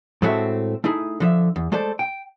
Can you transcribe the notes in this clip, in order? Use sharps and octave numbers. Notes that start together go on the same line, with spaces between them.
A2 G#3 A3 C4 F#4 E5
A3 D#4 E4 G#4
D3 F3 E5
E2
G#3 A3 A4 C5 D5
G5